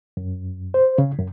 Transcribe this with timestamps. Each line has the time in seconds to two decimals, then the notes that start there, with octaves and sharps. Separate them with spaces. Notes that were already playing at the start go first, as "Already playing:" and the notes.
0.17 F#2
0.74 C5
0.98 C#3
1.18 F#2